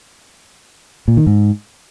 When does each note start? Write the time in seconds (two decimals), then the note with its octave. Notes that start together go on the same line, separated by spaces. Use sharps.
1.08 A#2
1.17 D#3
1.27 G#2